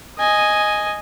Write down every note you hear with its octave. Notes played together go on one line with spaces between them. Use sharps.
D#5 G#5